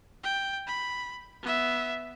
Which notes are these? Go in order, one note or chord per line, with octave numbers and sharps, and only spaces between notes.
G5
B5
B3 E5